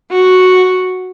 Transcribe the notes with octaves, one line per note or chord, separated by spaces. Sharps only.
F#4